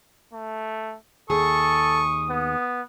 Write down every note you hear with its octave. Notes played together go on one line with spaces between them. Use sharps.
A3
D#2 G#4 A4 C#6 D#6
B3